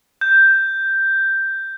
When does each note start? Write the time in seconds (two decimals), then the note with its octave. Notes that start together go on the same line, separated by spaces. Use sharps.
0.21 G6